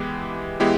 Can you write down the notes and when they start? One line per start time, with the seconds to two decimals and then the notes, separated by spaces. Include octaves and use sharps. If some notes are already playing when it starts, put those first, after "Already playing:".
Already playing: E3 G#3 B3 E4 G4
0.60 E3 G#3 B3 E4 G4